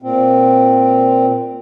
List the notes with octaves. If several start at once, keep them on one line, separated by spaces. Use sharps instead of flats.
A#2 C4